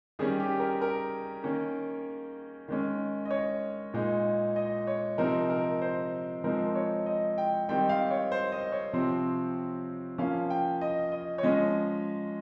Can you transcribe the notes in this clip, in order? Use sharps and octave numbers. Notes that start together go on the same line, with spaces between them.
D#3 G3 C#4 G#4
G4
A#4
A#4
D#3 A#3 C#4
D#3 G#3 C#4
D#5
C#5
A#2 G#3 D#4
D#5
C#5
C3 F3 C4 D#4 A#4
A#4
C5
F3 G#3 C4 D#4 A#4
C#5
D#5
G5
D#3 G3 C4 D#4 G5
F5
C#5
C5
D#5
C#5
C3 F3 C4
F3 A#3 C#4 F5
G5
D#5
D#5
C#5
F3 G#3 C#4 D#5